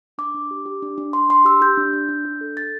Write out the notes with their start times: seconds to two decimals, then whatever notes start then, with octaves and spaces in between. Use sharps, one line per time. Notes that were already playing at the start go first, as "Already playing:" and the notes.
0.18 D4 D6
0.35 D4
0.51 G4
0.66 G4
0.82 D4
0.98 D4
1.13 D4 C6
1.29 D4 C6
1.45 G4 E6
1.61 G4 G6
1.78 D4
1.93 D4
2.09 D4
2.25 D4
2.41 A4
2.57 A4 A6